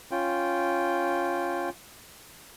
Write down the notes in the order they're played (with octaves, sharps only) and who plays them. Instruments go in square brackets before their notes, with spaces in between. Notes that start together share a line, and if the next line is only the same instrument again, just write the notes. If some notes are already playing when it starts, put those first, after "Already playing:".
[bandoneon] C#4 F4 G5